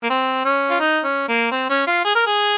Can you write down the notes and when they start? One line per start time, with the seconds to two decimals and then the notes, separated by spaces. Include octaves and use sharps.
0.03 A#3
0.10 C4
0.45 C#4
0.70 F4
0.80 D#4
1.04 C#4
1.28 A#3
1.51 C4
1.70 C#4
1.87 F4
2.05 G#4
2.15 A#4
2.27 G#4